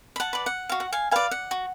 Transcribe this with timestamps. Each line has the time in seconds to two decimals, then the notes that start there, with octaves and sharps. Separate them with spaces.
0.16 B5
0.20 F#5 A5
0.33 B4 D5
0.46 F#5
0.69 F#4 F5
0.80 F#5
0.92 F5 G#5
1.11 B4 D5 F5 G#5
1.31 F#5
1.51 F#4